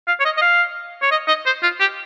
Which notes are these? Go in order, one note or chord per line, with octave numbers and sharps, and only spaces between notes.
F5
C#5
D#5
D#5
F5
C#5
D#5
D#5
C5
F4
G4